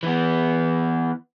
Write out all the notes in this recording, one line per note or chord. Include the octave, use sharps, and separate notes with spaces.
E3 B3